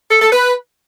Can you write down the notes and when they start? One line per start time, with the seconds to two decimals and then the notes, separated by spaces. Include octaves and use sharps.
0.11 A4
0.22 A4
0.32 B4